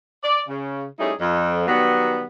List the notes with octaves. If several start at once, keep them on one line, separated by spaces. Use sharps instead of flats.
D5
C#3
G3 A3 C#4 D#4 E4 G#4
F2
D#3 F#3 G3 B3